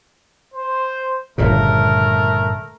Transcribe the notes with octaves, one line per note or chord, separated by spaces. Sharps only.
C5
G1 A#2 C#3 A3 A#4